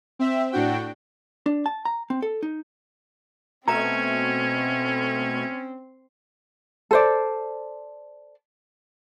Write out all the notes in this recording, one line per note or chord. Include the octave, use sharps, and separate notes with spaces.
C4 E5
A2 D4 F#4 G5
D4
A5
A#5
C4
A4
D#4
B2 A3 C4 C#4 E5 A#5 G#6
A4 C5 D5